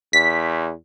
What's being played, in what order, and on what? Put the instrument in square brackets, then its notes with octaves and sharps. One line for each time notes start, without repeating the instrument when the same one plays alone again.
[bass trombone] E2 [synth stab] B6